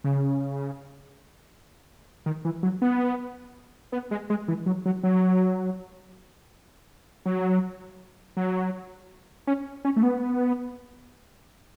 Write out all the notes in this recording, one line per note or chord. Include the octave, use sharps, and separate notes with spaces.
C#3
D#3
E3
F#3
B3
B3
G#3
G#3
E3
F#3
F#3
F#3
F#3
F#3
C#4
C#4
A3
B3